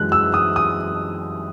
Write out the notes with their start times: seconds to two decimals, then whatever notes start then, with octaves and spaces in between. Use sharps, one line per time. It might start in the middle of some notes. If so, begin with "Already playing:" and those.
Already playing: F#2 E3 G#3 F#6
0.12 E6
0.34 D#6
0.56 D#6